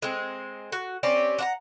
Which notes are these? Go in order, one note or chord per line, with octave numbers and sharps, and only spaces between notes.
G#3 C4
F#4
C4 C#4 G4 D5
D4 F#5 A#5